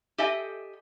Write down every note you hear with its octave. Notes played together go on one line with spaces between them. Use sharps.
G4 A4 D#5 E5 G#5